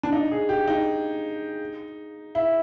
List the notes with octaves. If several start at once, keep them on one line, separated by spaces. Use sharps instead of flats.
D4
D#4
G#4
G4
D#4
E4